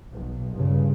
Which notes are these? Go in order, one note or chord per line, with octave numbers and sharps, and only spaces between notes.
B1
G2 A#2 C#3